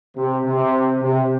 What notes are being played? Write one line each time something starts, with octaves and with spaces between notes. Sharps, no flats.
C3
C3
C3